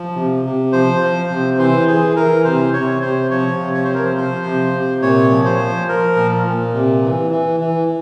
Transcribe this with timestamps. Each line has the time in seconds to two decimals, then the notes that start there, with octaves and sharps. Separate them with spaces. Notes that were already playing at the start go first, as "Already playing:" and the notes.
Already playing: F3
0.16 C3
0.45 C3
0.72 F3 C5
1.01 F3
1.30 C3
1.58 E3 C5
1.88 E3 G#4
2.16 E3 A#4
2.44 C3 C5
2.73 C3 C#5
3.01 C3 C5
3.30 F3 C#5
3.60 C3
3.74 C#5
3.84 F3 C5
3.94 A#4
4.04 C5
4.16 F3 C5
4.45 C3
4.73 C3
5.02 A#2 C#5
5.31 F3
5.45 C5
5.60 F3
5.88 F3 A#4
6.16 A#2
6.46 A#2
6.73 C3
7.03 E3
7.31 E3
7.60 E3